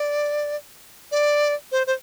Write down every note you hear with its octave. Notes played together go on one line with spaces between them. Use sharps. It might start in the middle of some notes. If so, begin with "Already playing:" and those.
Already playing: D5
D5
C5
C5